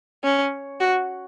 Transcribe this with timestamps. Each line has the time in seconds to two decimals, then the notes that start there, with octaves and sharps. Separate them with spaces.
0.24 C#4
0.80 F#4